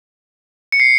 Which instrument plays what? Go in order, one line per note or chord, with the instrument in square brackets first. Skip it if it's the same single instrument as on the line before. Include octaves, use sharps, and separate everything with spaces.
[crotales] C#7
C7